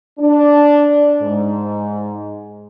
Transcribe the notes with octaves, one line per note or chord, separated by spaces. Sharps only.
D4
G#2